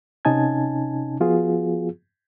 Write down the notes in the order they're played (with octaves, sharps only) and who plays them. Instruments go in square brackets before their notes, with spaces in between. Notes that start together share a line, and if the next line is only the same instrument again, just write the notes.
[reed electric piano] C3 C#4 D#4 G#5 A5 G#6
F3 B3 F4 F#4 G#4